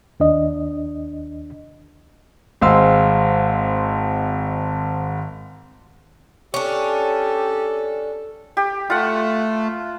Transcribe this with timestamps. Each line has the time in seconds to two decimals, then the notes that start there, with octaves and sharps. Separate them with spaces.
0.20 D#2 D4 D#5
2.61 G#1 G#3 C4 F5 C6 E6
6.54 C#4 D4 G4 A4
8.57 G4
8.90 A3 F4 F#5